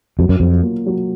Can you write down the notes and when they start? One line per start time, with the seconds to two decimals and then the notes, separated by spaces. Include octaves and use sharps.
0.19 F2 F#3
0.29 F#2
0.40 F2 F4
0.63 A#3
0.86 F#3